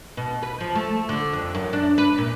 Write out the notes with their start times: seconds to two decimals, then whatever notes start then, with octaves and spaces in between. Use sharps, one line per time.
0.17 B2
0.43 B4
0.61 F3
0.75 A3
1.09 D3
1.33 F2
1.55 F#2
1.73 D4
1.98 B4
2.18 A#2